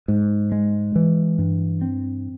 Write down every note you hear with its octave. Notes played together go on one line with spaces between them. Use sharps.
G#2
G#3
E3
G2
C4